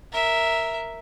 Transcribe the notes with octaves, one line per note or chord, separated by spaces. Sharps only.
A#4 E5